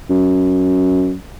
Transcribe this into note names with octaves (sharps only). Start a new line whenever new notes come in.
F#2